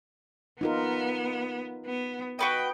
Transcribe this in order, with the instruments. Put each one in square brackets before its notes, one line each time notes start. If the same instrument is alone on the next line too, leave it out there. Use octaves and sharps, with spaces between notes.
[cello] B3 [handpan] D#4 F4 A#4
[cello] B3
[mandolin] F#4 B4 D#5 [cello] G5